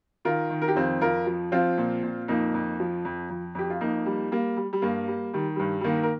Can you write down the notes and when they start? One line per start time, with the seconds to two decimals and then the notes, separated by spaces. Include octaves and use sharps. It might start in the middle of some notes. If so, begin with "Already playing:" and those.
0.25 D#3 F4 A#4
0.50 D#3
0.62 A#4
0.68 G4
0.75 F2 C4 F4
1.01 F2 F4 A#4
1.27 F3
1.52 F3 C4 F4
1.78 A#2
2.03 A#2
2.28 F2 A#3 D#4
2.54 F2
2.80 F3
3.05 F2
3.30 F2
3.55 F2 G4
3.70 F4
3.81 F2 A#3 D#4
4.06 G3
4.32 G3 A#3
4.57 G3
4.73 G3
4.82 G2 A#3
5.08 G3
5.33 D#3 G3
5.56 G2 G3
5.81 G3
5.84 D#3 A#3
6.03 A#4